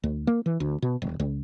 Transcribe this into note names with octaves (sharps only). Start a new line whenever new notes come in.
D2
A#3
E3
D2
B2
D#1
C#2